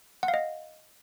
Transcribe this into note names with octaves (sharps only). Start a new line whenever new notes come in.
F#5
F5
D#5